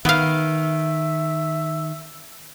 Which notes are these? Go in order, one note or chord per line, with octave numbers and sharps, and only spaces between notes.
D#3 B3 E5 F5